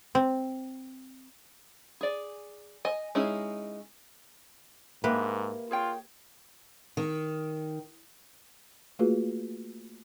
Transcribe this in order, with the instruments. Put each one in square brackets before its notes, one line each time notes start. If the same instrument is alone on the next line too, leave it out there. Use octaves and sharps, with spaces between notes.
[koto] C4
[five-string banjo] G#4 D5
D#5 G#5
G#3 C#4 D#4 E4 G#4
[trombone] G#2 [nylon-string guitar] A#3 [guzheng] G4 B4 [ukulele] E5
[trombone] F4 [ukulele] G#4 C#5 G5
[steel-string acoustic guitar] D#3
[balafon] A3 A#3 F4 F#4 G#4 B4